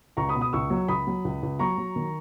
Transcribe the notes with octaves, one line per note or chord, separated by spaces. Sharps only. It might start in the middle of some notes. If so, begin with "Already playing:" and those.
C#2 A#5 C#6
B5 D#6
B2
B5 D#6
C#2 C#6 E6
F#3
C#2 B5 D#6
F#3
C#2
C#2
F#3 A#5 C#6
F#3
D#3